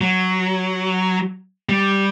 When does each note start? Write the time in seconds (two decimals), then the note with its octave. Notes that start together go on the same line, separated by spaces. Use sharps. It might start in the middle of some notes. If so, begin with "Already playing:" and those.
0.01 F#3
1.69 G3